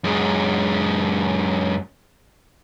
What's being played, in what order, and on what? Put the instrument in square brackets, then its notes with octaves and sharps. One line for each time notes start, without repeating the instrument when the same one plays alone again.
[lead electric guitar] F#2 G#3